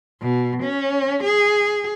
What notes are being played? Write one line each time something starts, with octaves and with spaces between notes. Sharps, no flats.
B2
C#4
G#4